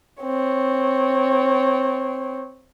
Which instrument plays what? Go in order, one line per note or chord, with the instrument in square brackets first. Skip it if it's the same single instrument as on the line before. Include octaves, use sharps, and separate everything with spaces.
[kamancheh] C4 C#5